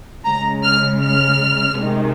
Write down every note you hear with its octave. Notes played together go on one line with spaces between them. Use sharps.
C#3 G#3 A#5
F6
F6
C3 D#3 G#3